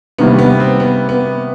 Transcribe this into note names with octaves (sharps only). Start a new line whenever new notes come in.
C3 D#3 G3 A#3 B3
B3
C4
B3
B3